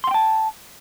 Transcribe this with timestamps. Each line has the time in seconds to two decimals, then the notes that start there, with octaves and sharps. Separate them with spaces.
0.04 C6
0.07 F#5
0.11 G5
0.14 A5